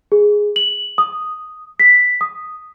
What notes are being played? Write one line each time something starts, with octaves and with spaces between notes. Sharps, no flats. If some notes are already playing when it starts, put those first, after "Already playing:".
G#4
F#7
D#6
B6
D#6